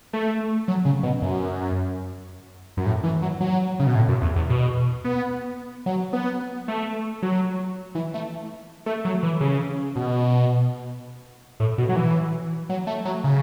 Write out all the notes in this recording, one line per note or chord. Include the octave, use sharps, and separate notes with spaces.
A3
F#3
C#3
B2
F#2
F#2
A2
E3
F#3
F#3
C#3
B2
A2
F#2
E2
E2
B2
B3
F#3
B3
A3
F#3
E3
A3
A3
F#3
E3
C#3
B2
A2
B2
F#3
E3
F#3
A3
F#3
C#3